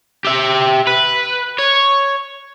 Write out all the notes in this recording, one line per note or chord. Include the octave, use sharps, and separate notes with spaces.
G4 E5
B4
C#5